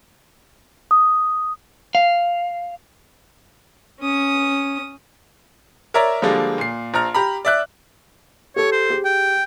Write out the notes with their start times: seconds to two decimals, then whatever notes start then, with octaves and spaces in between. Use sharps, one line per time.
0.91 D#6
1.95 F5
4.00 C#4 D#6
5.94 A#4 C#5 D5 E5 A#5
6.22 D3 F3 G3 G#3 A#3
6.58 A#2 C7
6.94 A#1 A#5 F6
7.15 G4 A#5 B5
7.45 D5 E5 F#6
8.56 G4 A4 C#5
8.72 C5
8.89 G4 G#4
9.05 G5